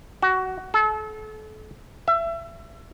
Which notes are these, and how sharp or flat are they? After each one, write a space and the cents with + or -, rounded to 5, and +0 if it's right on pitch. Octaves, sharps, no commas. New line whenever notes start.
F#4 +20
A4 -35
E5 +25